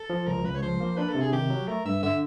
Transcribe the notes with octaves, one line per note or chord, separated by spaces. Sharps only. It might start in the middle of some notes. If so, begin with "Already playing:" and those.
Already playing: A4
F3
C#2 A#4
C#2 B4
C#5
F3 C5
A#3
D4 B4
A4
C3
G#4
D#3 G4
F#3
A3 A#4
G2 E5
D3 E5